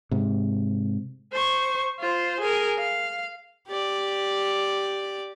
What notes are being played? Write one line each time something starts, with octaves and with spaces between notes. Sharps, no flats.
G#2 C3
C5 C#6
F4 C5
G#4 A#4
F5
G4 D5